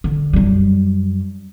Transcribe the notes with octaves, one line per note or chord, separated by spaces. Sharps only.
D3
F#2 G3